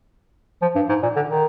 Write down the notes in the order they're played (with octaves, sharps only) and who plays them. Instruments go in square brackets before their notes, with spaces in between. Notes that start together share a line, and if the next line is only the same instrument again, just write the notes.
[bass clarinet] F3
G2
G#2
A#2
D3
D#3